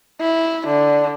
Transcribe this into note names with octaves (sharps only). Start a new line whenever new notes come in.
E4
D3